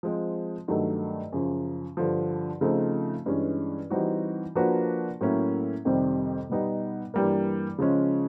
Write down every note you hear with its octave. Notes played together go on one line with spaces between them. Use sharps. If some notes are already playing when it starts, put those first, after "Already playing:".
F3 G#3 C4
G2 D#3 F#3 A3
F#2 C#3 F3
G2 D3 F3
C#3 F3 A3 C4 D#4
G2 E3 G#3 C#4
E3 G3 C4 D#4 F#4
F3 A#3 D4 F#4 B4
A2 F#3 A#3 C#4 E4
F2 C3 D#3 G3 C4
B2 G3 B3 D#4
G2 E3 G3 A#3
C#3 F3 G#3 C#4